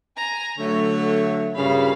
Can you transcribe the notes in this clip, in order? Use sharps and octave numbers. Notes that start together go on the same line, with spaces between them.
G#5 A#5
D3 F#3 A3 C#5
G2 A#2 C#3 F5 B5